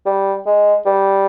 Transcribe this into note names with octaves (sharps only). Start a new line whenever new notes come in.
G3
G#3
G3